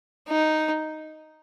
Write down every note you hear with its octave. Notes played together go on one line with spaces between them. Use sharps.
D#4